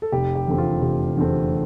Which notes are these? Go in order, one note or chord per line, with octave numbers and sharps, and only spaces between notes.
A4
F1 G4
G4
E2 D3 A3 C4
F4
F1 G4
E2 D3 A3 C4